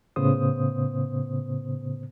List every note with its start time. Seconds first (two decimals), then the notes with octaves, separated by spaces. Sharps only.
0.16 A2 C#3 B3 C5 D#6